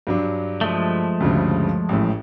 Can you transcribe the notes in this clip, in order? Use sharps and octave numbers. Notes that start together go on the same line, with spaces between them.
G2 F#3 D4
F3 G#3 A3
D2 G2 C#3
A1 A2